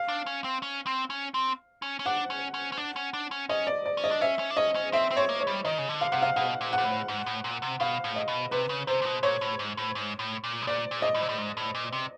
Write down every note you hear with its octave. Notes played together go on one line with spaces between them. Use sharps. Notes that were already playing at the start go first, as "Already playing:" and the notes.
Already playing: F5
D4
C#4
C4
C#4
C4
C#4
C4
C#4
C#4
D4 F#5
C#4
C#4
C#4
D4
C#4
D4
C#4
C#4 D#5
D5
D5
C#4
D#5
D4
C#4 E5
C#4
D4
C#4 D#5
C#4
C4 E5
C4
C#5
A#3
C#5
G3
D#3 D#5
C#3
D3
F5
C3 F#5
F5
B2 F#5
A#2
F#5
A#2
A2
G#2
A2
A#2
C3
B2 F5
A2
D#5
B2
C3 B4
C#3
C3 C5
A#2
B2
A#2 C#5
A2
G#2
A2
G#2
A2
A#2
B2
A#2 D5
A#2
D#5
A2
A#2
A2
G#2
A2
A#2
C3